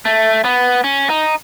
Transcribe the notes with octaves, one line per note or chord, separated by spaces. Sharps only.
A3
B3
C#4
D#4